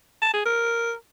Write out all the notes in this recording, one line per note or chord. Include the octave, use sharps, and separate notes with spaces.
A5
G#4
A#4